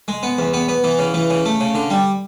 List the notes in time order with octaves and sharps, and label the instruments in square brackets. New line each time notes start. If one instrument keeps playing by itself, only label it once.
[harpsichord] G#3
B3
E2
B3
B3
E3
C#3
E3
C#3
A3
C#3
D3
G3